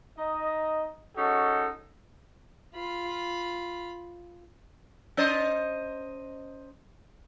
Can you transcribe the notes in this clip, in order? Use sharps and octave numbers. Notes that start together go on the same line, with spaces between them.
D#4 D#5
G#3 C#4 D#4 F#4 A4
F4 B5
C#4 C5 D#5